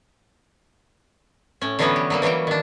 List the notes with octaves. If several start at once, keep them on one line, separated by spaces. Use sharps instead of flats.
A2 C#4
D3 E3 F#3 G3 B3 C#4
G4
F#3 G3 A#3
E3 F#3 G3 G4 G5
D#3 D4